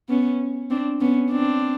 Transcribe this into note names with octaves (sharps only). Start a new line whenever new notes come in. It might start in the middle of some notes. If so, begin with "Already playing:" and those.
B3 C#4
C4 D4
B3 C#4
C4 D4